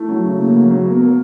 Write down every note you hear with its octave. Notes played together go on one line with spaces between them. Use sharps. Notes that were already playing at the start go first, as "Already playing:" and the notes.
Already playing: A3 E4
F#3
C#3
C#3 A#3
F#3
F#3
A#3 B3
A#3